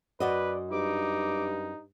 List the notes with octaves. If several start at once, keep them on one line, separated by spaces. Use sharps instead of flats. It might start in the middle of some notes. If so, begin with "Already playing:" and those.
F#2 F#4 B4 D5 D#5
G2 D#4 D6